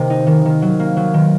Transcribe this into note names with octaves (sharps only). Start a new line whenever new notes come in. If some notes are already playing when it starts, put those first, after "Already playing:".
Already playing: C3 D#3 A#3
D#4
D#3
D#3
F#3
A#3
F#3
D#3